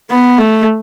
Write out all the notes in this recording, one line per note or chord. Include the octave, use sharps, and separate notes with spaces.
B3
A3